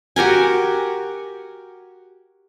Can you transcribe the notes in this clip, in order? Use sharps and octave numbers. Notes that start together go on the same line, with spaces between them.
F#4 G4 A#4 G#5